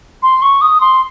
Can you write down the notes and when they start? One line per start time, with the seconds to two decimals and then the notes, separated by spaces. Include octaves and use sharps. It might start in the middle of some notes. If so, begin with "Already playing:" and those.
0.23 C6
0.42 C#6
0.61 D#6
0.81 C6